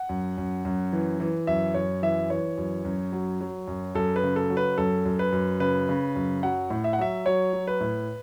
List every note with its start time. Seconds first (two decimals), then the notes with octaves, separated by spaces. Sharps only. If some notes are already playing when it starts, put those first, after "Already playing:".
Already playing: F#5
0.09 F#2
0.38 F#2
0.65 F#2
0.93 E3
1.20 E3
1.47 F#2 E5
1.74 F#2 C#5
2.03 E3 E5
2.30 E3 C#5
2.58 F#2
2.85 F#2
3.12 F#3
3.41 F#3
3.68 F#2
3.95 F#2 A4
4.16 B4
4.24 C#3
4.36 A4
4.50 F#3
4.57 B4
4.78 F#2 A4
5.06 F#2
5.19 B4
5.33 F#2
5.60 C#3 B4
5.89 C#3
6.16 F#2
6.43 F#3 F#5
6.70 A2
6.84 E5
6.93 F#5
6.99 F#3 E5
7.26 F#3 C#5
7.53 F#3
7.67 B4
7.81 A2